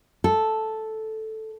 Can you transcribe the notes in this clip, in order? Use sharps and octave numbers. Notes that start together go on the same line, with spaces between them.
A4